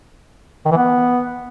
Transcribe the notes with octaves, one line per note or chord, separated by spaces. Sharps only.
D#3
E3
B3